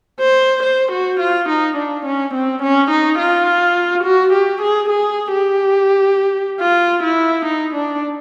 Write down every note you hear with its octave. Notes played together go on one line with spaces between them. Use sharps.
C5
C5
F#4
F4
D#4
D4
C#4
C4
C#4
D#4
F4
F#4
G4
G#4
G#4
G4
F4
E4
D#4
D4